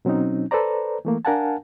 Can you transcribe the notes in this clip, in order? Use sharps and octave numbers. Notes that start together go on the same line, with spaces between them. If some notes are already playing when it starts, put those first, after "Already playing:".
B2 F#3 C4 C#4 D#4
A4 B4 C5 D5 A#5
E3 A3 A#3
D4 A#4 F5 F#5 G#5 A5